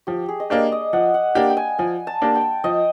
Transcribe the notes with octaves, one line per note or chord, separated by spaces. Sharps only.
F3 G4
G#4
D#5
A#3 D4 G4 D5
D#5
F3 F#5
F#5
A#3 D4 G4 G5
G5
G#5
F3 G#5
A5
A#3 D4 G4
G5
F3 D#5